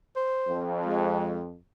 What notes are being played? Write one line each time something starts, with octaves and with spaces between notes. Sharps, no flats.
C5
F2
G#3